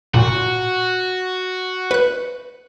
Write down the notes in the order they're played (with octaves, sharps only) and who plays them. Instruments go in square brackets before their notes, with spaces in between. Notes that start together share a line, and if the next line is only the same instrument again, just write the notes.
[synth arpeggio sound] A#2 [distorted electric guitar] F#4
[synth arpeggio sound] B4 F#6